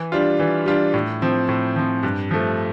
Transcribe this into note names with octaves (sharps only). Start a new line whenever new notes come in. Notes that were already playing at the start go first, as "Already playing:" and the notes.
Already playing: E3
G3 D4 F4
E3
G3 D4 F4
A2
F3 C4
A2
F3 C4
G2
F3 A3